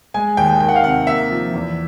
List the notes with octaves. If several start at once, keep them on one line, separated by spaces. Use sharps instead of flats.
G#3 G#5
D#2 G5
D#3 G5
F#5
F5
C3 F#5
A#3 E5
F3
E2